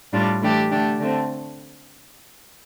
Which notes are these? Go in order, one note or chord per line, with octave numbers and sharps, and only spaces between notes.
A2 G3 D4 F4
E3 A3 D4 G4
D3 A3 D4 G4
D3 A3 C4